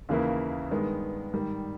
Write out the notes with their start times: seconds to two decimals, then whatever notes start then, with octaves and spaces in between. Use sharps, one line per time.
0.09 D#2 C#3 E3 A#3 E4
0.71 G2 D#3 G#3 B3
1.33 G#2 D#3 G3